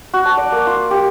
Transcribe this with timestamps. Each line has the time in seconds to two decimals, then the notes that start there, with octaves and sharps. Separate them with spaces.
0.14 F#4
0.25 A5
0.37 D5
0.52 A#3
0.67 F4
0.91 G4